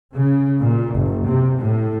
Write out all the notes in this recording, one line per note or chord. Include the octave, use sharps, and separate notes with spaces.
C#3
A#2
F#1
C3
A2